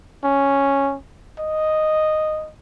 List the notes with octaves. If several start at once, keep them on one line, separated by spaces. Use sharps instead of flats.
C#4
D#5